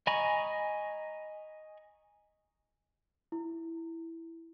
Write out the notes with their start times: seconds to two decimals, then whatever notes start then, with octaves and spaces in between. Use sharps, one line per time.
0.07 D#5 G#5 A#5 B5 C#6
3.32 E4